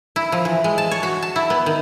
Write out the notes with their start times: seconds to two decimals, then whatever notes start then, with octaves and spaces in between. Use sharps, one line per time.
0.16 E4
0.32 F3
0.45 E3
0.64 G#3
0.78 A5
0.91 C#5
1.03 F#4
1.22 A5
1.36 E4
1.50 B3
1.66 D#3